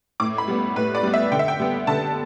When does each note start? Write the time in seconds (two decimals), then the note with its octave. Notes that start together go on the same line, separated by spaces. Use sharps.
0.20 A2 D6
0.38 B5
0.48 G3 B3
0.76 A2 B4
0.95 D5
1.03 G3 B3
1.14 E5
1.32 D3 G5
1.39 E5
1.48 G5
1.60 G3 B3
1.87 D3 A5